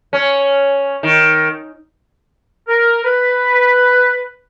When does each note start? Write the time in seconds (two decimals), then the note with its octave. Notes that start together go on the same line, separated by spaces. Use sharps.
0.13 C#4
1.03 D#3
2.68 A#4
3.04 B4